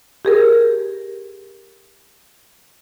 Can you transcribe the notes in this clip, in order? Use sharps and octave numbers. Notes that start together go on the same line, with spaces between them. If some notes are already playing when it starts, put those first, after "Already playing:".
G4 G#4 A#4